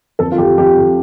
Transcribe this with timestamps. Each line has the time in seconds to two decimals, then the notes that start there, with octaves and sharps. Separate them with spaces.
0.19 F2 A4
0.32 F4
0.38 F2 G4
0.57 F2 G4
0.77 F2